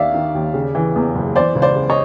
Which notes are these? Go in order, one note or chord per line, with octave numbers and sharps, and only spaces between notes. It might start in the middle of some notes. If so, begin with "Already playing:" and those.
Already playing: D#2 D#3 D5 E5 F5
D#3
D#2
C#3
E3
E2
F#1
E3 C5 D5
C#2
C5 D5
C#3
C#5 D#5